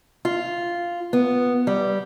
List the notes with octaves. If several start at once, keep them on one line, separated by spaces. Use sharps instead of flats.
F4
B3
G3